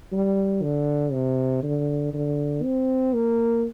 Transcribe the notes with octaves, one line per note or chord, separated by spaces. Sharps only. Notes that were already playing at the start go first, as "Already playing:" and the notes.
G3
D3
C3
D3
D3
C4
A#3